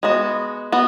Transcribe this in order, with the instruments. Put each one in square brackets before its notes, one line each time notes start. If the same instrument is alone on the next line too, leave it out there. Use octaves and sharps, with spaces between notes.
[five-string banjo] G#3 B3 F#4
B3 F#4